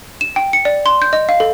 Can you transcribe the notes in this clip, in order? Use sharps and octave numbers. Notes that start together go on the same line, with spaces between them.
E7
G5
C#7
D5
C6
G6
D#5
F5
A4